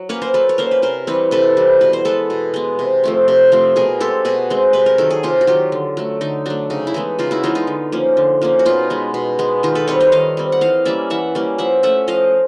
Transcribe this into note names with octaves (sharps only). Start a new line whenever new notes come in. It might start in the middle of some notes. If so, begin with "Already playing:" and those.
Already playing: F#3
A#3 C#4 B4 C#5
A#4 C5
F#3 A4 B4
C#5
A#3 C#4 A#4 C5
B4
C3 A#4 C5
E3 G3 C4 B4 C#5
C3 A4 B4
E3 G3 C4
B2 B4
C5
G#3 B3 A4 B4
B2
G#3 B3
C3
F3 A3 C4
C3
F3 A3 C4
B2 G#4 A#4
G#3 C4 G4 A4
B2 F#4 G#4
G#3 C4
C3 B4
A#4
D#3 F#3 A4
G#4
C3 F4 G4
F#4
D#3 F#3 F4 G4
D3
F#3 A3
D3 D#4
F#3 A3 D4
C#3 D#4
E4
E3 G#3 B3 D#4
C#3 D#4 F4
E4 F#4
E3 G#3 B3 D#4 F4
D#4 F4
D3
F3 A#3 C#4
D3
F3 A#3 C#4
F#4
B2 D#4 F4
G#3 B3
B2
G#3 B3
D#3 D#4 F4
A4 B4
G3 C4 B4 C#5
C#5 D#5
D#3 D#5 F5
G3 C4
F#5
E3 D#5 F5
G3 A#3 C#4 D5 E5
E3 E5 F#5
G3 A#3 C#4
F3 E5 F#5
A3 C#4 E5 F#5
F3 D#5 F5